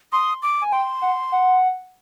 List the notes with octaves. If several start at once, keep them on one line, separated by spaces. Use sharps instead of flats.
C6 D#6
D6
G#5
G5 C6
F#5
F#5